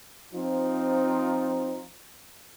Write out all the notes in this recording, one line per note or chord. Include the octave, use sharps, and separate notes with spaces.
F3 C4 D#4 F4